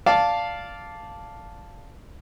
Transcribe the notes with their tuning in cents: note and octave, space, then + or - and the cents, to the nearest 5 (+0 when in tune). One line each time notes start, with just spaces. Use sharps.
D5 -10 F5 +0 A5 +0